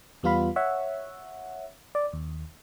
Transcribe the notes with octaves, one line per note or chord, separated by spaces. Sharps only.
E2 G3 B3 F4 F5 B5
C#5 E5 F#5
D5
D#2